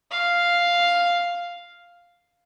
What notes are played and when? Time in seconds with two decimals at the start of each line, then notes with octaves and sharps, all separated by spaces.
0.11 F5